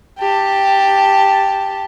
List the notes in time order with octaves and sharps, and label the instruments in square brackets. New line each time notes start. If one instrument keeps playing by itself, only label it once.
[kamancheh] G4 A5